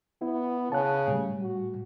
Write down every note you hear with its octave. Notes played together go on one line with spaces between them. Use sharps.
B3 E4
C#3 A5 F#6
A2 G3
F#4